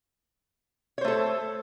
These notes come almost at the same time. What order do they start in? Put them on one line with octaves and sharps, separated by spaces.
C#5 C5 A3 A4